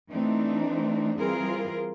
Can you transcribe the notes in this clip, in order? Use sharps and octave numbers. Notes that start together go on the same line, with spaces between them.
E3 A3 C4 D4 D#4
E3 G3 C4 F4 G#4 A#4